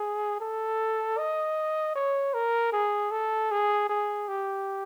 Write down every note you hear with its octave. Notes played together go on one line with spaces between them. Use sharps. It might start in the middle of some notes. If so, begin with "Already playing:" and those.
Already playing: G#4
A4
D#5
C#5
A#4
G#4
A4
G#4
G#4
G4